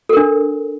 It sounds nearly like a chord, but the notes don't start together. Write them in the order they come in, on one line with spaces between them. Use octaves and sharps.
A4 A#4 D4